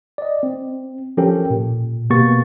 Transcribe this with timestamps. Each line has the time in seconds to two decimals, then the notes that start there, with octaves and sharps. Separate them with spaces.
0.18 D5 D#5
0.43 C4
1.17 F3 C#4 G4 A4 A#4 G5
1.50 A#2
2.10 B2 A#3 B3 G4 C#6 A6